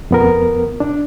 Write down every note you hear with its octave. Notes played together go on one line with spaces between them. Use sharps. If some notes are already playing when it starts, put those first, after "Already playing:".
F2 B3 A#4
D4